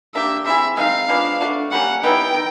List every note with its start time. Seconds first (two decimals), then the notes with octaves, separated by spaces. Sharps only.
0.15 A#3 D4 G4 E5
0.45 C4 E4 G#4 E5
0.77 G#3 C4 D#4 F5
1.08 F3 G#3 B3 D4
1.41 A3 D4 F#4
1.72 G3 A#3 C#4 F#5
2.03 E3 G3 B3 D#4 G5
2.34 D#3